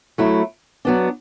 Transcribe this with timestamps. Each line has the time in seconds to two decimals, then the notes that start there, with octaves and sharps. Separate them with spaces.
0.18 F#3 A3 E4
0.85 F#3 B3 D4